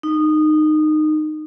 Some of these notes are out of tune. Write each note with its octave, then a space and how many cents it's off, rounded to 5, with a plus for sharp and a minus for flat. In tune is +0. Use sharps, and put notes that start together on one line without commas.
D#4 -20